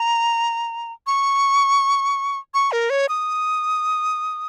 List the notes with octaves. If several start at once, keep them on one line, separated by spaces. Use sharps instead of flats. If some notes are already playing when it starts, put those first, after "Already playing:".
Already playing: A#5
C#6
C#6
A#4
C#5
D#6